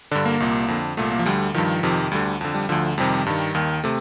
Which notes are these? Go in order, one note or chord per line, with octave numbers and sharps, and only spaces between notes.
G2 D3 D4
A#3
C2 A#2
F2 D3
C2 A#2 A3
A#3
F3
D2 D3 G3
G2 D#3 F3
F2 C3 D#3
D2 D3 G3
F2 D3
G3
D2 D3 F3
F2 C3 D#3 G3
G2 D#3
D#2 D#3
C3 A3